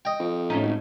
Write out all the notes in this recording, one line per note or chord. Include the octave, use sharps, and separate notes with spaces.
D#5 G5
F2
A2 C#4 D#4
G#1